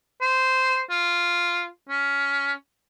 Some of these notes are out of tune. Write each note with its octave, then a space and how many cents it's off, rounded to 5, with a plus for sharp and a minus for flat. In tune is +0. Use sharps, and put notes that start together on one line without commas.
C5 -10
F4 -5
C#4 +15